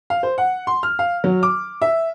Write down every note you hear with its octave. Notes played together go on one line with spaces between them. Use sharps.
F5
C5
F#5
C6
F6
F5
F#3
D6
E5